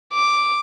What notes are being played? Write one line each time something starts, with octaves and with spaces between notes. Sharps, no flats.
D6